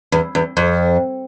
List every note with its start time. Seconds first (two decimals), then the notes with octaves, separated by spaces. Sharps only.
0.12 E2
0.35 E2
0.57 F2